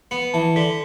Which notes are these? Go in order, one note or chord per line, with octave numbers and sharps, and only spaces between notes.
B3 C#7
E3 A5
D3 B6